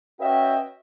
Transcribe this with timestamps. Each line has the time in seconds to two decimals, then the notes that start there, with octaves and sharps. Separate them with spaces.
0.20 C#4 F#4 B4 D#5 E5 G5